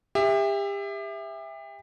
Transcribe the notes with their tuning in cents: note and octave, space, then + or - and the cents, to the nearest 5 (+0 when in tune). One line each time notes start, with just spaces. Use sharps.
G4 +35 E5 +0